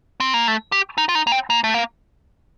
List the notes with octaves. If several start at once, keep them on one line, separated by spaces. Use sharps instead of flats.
C4
A#3
A3
G4
D#4
F4
D#4
A#3
C4
A#3
A3
A#3